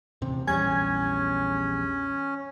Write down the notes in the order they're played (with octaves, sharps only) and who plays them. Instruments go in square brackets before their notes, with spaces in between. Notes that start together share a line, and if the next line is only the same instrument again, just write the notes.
[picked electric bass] D#1 A1 C3
[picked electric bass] A#1 E2 G3 [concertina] C#4 [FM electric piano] G#5 G#6